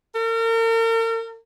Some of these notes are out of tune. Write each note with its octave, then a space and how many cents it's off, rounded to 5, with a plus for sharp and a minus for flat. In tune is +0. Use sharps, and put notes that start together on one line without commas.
A#4 -40